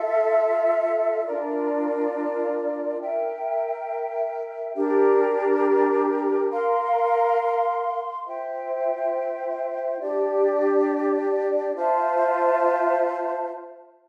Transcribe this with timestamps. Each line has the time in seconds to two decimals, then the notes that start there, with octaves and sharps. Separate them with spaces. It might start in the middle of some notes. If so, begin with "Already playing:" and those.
Already playing: F4 A4 E5
1.26 D4 F4 A#4 D5
3.00 A#4 E5 G5
4.75 D4 G4 A#4
6.50 A#4 F5 C6
8.26 F4 C5 E5 G5
10.00 D4 G4 D5
11.75 F4 C5 E5 A5